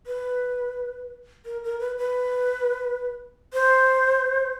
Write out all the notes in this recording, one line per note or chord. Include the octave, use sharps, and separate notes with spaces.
B4
A#4
A#4
B4
B4
C5